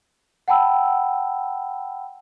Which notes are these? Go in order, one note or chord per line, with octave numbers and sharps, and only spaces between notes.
F#5 G5 A5 B5 E6